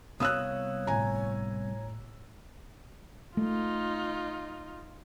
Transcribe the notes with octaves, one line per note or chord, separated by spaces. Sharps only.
C2 B3 C#5 F5 D#6 E6 F#6
G1 A2 G#5 A#5
A3 D#4 F4